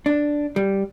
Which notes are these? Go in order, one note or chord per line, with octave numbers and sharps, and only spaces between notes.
D4
G3